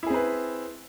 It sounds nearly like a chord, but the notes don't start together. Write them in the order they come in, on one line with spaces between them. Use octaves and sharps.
E4 G#4 C4 B4